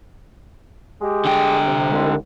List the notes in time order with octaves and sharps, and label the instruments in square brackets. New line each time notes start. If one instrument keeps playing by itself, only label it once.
[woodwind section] G#3 G4
[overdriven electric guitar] D3 G5
[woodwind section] C3
C2 D#3 G#3